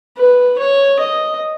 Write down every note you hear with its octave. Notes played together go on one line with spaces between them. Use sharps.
B4
C#5
D#5